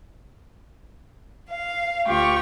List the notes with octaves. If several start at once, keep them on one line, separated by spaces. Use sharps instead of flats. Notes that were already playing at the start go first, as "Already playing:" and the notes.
F5
D2 F4 G4 C#6